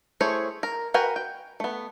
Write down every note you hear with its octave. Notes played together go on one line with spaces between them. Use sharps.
A3 E4 G#4 C5 C#5
A#4
F#4 A#4 B4 G5 G#5
G5
A3 B3